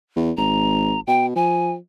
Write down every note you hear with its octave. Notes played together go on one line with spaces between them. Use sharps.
E2
G#1 A#5
B2 G5
F3 G#5